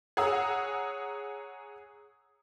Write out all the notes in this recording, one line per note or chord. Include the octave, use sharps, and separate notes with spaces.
G#4 C#5 F#5 A#5 D#6 E6